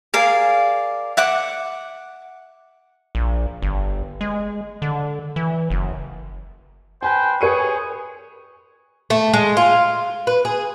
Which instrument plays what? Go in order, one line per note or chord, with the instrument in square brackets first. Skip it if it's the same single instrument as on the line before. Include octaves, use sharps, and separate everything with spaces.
[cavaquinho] G#4 A#4 D5 F5
E5 F#5 D6
[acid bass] A#1
G1
G#3
D3
E3
F#1
[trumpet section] B4 C5 G5 [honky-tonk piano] G#5
[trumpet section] G#4 C#5 [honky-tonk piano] B4 C#7 D#7
[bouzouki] A3
G#3
F4
B4
G#4